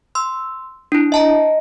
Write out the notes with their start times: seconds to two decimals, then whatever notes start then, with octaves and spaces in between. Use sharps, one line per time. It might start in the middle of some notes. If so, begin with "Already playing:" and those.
0.15 C6 E6
0.92 D4 E4
1.12 D#5 E5 A5 A#5